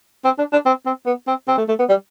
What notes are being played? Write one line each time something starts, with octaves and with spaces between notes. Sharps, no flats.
C4
D4
D4
C4
C4
B3
C4
C4
A3
A3
B3
G3